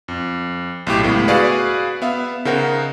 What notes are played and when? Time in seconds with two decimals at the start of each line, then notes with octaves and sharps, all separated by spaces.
0.08 F2
0.87 B1 A2 G4
1.03 C#2 A2 B3
1.28 F#4 G#4 B4 D5 F5
2.02 B3 E5 F5
2.45 C#3 D#4 A#4 C5 F#5